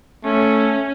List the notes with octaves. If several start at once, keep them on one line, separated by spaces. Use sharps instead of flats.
A3 C#4